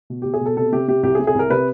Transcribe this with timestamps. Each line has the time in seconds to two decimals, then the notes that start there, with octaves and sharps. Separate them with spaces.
0.10 B2
0.22 B2 G4
0.34 G#4
0.41 B2 A4
0.57 C3 A4
0.72 C3 G4
0.88 C3 G4
1.03 C2 G4
1.15 G#4
1.19 C3
1.27 G#4
1.35 C2 A#4
1.50 C3 B4